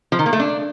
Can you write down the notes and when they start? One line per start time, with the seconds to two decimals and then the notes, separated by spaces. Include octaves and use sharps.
0.12 F3
0.19 D#3
0.26 A#3
0.33 A3
0.40 D4